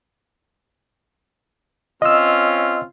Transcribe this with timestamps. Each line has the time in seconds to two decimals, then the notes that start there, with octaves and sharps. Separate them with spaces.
2.02 C4 C#4 F4 D#5 E6